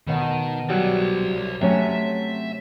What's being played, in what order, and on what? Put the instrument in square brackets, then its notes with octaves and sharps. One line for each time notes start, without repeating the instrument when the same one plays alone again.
[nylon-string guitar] B2 F#5 A5 [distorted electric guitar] D#3
[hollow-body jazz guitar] F#3 G3 [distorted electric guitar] C5 D5
[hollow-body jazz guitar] C3 C#4 [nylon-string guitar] F#3 A3 C4 [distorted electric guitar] E5